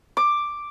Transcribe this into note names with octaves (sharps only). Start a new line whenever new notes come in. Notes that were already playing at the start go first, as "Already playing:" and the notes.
D6